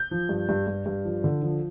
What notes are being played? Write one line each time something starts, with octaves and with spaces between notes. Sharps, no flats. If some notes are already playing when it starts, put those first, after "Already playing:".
Already playing: G6
F3
G2
G2
G2
G2
F3
D3
F3